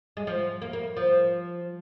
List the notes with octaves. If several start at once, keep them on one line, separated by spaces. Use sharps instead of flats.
G#3
F3
A#3
A#3
F3